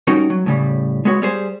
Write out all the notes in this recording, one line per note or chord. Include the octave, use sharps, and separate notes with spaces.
G3 C#4 D#4 F#4 A#4
F#3
A2 C#3 G3
G#3 B3 F#4 C#5
G3 G#4 C5